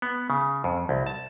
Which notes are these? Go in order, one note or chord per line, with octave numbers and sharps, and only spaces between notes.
B3
C#3
F2
C2
A5